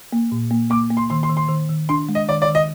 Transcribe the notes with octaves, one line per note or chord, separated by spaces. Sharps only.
A#3
A#2
A#3
A#3 D6
A#3
C6
D#3 C6
C6
D#3
C6
D#3
D#3
D4 C6
G#3
D#5
D#3 D5
D5
D#3
D#5